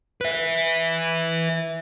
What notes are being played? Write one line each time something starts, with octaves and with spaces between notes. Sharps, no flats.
B4 E5